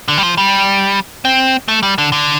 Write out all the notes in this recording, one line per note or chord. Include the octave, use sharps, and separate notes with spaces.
D3
G3
F3
G3
C4
A3
G3
D3
D3